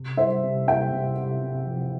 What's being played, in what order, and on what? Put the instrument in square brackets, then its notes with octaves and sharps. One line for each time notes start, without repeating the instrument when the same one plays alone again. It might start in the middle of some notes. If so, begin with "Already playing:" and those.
Already playing: [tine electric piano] C3
[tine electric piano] G3 [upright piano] C5 E5
[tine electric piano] C3
[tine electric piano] C3 [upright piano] E5 G5
[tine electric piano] C3
C3
C4
F3